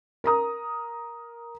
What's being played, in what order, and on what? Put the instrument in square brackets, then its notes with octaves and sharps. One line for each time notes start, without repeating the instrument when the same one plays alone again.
[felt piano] A#4 A#5 D#6